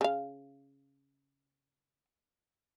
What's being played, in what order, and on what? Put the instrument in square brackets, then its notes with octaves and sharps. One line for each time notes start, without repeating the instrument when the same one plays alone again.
[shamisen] C#3 F5